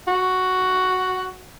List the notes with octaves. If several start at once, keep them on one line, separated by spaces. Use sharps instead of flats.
F#4